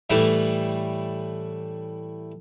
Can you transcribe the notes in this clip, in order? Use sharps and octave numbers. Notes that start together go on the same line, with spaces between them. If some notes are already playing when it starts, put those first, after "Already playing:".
A2 E3 G3 A3